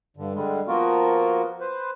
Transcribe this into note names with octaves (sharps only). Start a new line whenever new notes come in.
G2 D3
D3 G3 G#3
F3 A#3 B3 F4 F#4 A#4
B4 C5